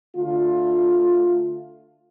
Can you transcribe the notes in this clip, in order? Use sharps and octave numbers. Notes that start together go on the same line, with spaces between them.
D3 A3 F4